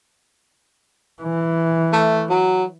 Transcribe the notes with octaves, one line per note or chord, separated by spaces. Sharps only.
E3
A3
F#3